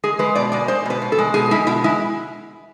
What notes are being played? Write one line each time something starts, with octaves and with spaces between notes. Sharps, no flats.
G#3 G#4
G#3 B4
B2 D5
G#3 D5
G#3 C5
B2 B4
B2
A4
G#3
B2 G#4
G#3 E4
B2 E4
G#3 E4